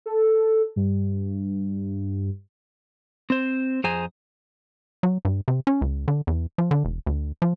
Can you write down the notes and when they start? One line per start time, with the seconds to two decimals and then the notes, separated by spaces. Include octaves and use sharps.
0.06 A4
0.76 G2
3.30 C4 C5
3.84 F2 G#4 C5 G#5 A#5
5.03 F#3
5.25 G2
5.48 C3
5.67 C#4
5.81 C#2
6.08 D3
6.27 E2
6.58 F3
6.71 D3
6.85 E1
7.06 D2
7.42 F3